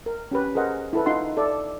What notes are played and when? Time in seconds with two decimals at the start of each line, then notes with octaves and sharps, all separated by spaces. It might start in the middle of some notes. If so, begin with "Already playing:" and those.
0.06 A#4
0.31 C#4 G4 B4
0.55 G#4 A#4 C5 D#5 F#5
0.93 E4 A4 B4
1.06 D#4 F4 F#5 C6
1.37 A4 D5 E5